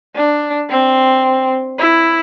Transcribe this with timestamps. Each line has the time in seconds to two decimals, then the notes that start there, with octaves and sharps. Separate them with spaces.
0.16 D4
0.70 C4
1.79 E4